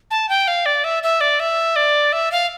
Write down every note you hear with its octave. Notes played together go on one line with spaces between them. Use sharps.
A5
G5
F5
D5
E5
E5
D5
E5
D5
E5
F5